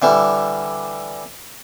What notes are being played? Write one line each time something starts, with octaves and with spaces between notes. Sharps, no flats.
D3 E3 G3